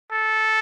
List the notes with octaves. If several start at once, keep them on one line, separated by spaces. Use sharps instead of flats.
A4